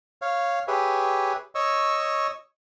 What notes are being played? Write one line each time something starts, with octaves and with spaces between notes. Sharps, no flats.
C#5 F5
G4 G#4 B4 C#5 E5
C#5 D#5 C#6 E6